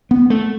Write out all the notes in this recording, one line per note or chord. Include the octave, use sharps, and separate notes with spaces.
B3
A3